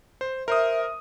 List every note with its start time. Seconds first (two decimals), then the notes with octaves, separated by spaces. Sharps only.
0.21 C5
0.48 A#4 C5 E5 D#6